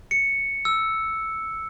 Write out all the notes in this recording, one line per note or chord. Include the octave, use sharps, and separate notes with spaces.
C#7
E6